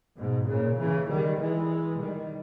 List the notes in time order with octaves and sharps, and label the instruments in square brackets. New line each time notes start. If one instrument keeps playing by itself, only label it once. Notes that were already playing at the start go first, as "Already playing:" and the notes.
[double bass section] G#2 B2
A#2 C#3
C#3 E3
D#3 G3
E3 G#3
D#3 G3